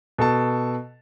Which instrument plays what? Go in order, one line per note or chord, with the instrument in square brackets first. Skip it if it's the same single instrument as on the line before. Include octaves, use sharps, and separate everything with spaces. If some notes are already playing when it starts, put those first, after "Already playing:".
[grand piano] B2 A4 A5